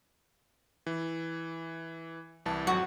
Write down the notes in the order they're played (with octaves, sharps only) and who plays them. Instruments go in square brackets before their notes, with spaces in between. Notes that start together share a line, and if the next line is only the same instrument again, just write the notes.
[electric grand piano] E3
C2 E3 A5
[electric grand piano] G#1 F2 F#3 [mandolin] F#4